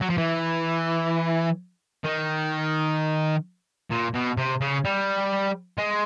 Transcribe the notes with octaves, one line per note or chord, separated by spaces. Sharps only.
F#3
F3
E3
D#3
A#2
B2
C3
C#3
G3
G#3